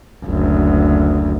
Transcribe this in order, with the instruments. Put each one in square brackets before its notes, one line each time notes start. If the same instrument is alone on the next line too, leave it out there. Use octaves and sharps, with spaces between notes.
[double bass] F#1 D2